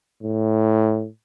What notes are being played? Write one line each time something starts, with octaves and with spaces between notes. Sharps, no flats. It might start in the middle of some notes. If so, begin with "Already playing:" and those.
A2